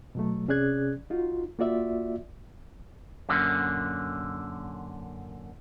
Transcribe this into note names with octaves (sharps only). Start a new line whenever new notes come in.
B2 F#3 A3
C3 C#4 G#4 D5 F#6 G#6
D#4 F4 F#4
A#3 F4 F#4 D5 E5
F#2 A#2 D3